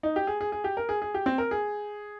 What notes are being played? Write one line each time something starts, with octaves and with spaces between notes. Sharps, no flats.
D#4
G4
G#4
G#4
G#4
G4
A#4
G#4
G#4
G4
C4
A#4
G#4